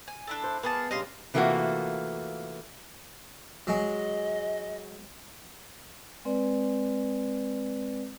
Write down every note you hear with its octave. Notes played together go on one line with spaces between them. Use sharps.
G#5
D4 E4 A4
C5
A#3 B3 G#4 A5
G2 C#3 D#5 F5 C6
C3 E3 A3 A#3 F4 F#4
F#3 G#3 D#5
G#3 C4 B4 D5